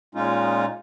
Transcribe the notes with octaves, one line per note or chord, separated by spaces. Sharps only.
A#2 G#3 C#4 D#4 F4